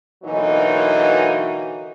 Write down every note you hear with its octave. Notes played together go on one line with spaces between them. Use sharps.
B2 D3 E3 F#3 A#3 D#4